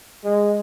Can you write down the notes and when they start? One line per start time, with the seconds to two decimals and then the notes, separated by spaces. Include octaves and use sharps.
0.24 G#3